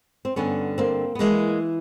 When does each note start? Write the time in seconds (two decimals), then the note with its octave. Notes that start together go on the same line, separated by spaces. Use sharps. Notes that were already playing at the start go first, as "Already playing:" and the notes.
0.25 C4
0.36 G2 D3 B3 C#4
0.78 A#3 C4
1.15 B3
1.19 E3 G#3 A#3